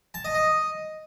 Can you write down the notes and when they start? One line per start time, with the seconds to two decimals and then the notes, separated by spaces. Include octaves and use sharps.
0.14 A5
0.24 D#5
0.35 D#5